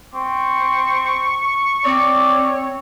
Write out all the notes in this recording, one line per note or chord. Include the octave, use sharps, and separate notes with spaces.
C4 C#6
C4 C#5 D5